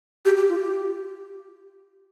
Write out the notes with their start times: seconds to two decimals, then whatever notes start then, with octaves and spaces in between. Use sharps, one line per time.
0.25 G4
0.37 G4
0.49 F4
0.62 G4